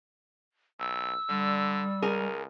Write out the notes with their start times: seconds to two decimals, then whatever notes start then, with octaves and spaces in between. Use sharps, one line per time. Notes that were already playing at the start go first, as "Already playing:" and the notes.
0.80 B1 E6
1.29 D3 G3
2.02 C#2 G#4 A#4 G#5